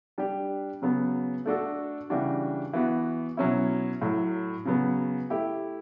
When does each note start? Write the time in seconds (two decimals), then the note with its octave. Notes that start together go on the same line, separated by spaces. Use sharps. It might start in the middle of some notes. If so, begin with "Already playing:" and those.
0.18 G3 D4 G4
0.82 C#3 F#3 B3
1.46 A3 D4 F#4 A4
2.10 C#3 E3 G3 D4 F#4
2.73 E3 B3 F#4 B4
3.37 B2 F#3 C#4 E4
4.02 A2 F#3 A3
4.65 C#3 F#3 B3
5.30 A3 E4 G4